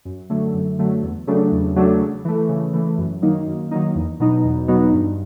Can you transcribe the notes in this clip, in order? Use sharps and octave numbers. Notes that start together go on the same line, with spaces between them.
F#2
D3 F#3 A3
F#2
D3 F#3 A3
E2
C#3 F#3 A3 D4
E2
C#3 F#3 A3 D4
C#3
E3 A3
C#3
E3 A3
F#2
D#3 F#3 A#3 D#4
F#2
D#3 F#3 A#3 D#4
E2
B2 F#3 B3 D#4
E2
B2 F#3 B3 D#4
G2